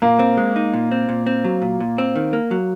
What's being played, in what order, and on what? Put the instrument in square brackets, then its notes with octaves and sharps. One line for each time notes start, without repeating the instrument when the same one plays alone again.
[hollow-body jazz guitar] A#2 [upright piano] A#3
[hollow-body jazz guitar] C4
G#3
D#4
A#2
C4
A#2
C4
F#3
A#2
A#2
C4
D#3
A#3
F#3